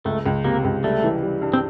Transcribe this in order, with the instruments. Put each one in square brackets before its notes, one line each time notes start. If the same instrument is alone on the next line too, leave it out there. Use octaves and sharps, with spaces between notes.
[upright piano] C#2 [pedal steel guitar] A3
[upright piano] C#2
[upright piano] C3 [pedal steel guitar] A#3
[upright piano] C#2
[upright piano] G3 [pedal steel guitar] A3
[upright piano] E3
G3
G2
[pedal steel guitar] C4